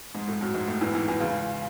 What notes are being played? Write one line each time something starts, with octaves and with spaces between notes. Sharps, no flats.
G#2 G#3
A2 A3
F#2 F#3
G#2 G#3
A2 A3
E2 E3
E2 E3
E2 E3
C#2 C#3